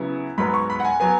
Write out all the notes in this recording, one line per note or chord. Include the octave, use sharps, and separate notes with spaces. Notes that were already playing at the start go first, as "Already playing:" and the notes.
Already playing: C#3 F#3 B3 E4
G#2 F#3 B3 B5
C#6
B5
F#5
G#5
F#3 B3 G#5